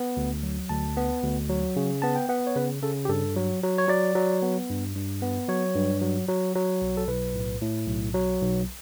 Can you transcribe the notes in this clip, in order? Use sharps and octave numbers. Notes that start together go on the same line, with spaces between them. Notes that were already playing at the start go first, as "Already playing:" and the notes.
Already playing: B3
D2
F#3
D2 A5
B3
D2
F#3
C#3
B3 A5
G5
B3 F#5
C#5
C#3 B4
C#3 A4
G4
G2 A4
F#3
F#3
C#5
F#3 D5
F#3
B3
G2
G2
B3
F#3 C#5
G2
F#3
F#3
F#3
B1
A4
B1 B4
A2
A2
B1
F#3
B1